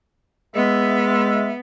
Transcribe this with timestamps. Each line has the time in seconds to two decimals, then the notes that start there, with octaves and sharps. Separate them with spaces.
0.55 G#3 B3 E5